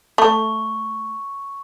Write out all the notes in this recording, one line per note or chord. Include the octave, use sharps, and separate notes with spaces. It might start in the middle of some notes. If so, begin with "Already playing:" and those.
A3 C#6